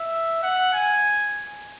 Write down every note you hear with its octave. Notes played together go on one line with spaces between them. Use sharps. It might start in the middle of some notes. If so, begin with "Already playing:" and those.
Already playing: E5
F#5
G#5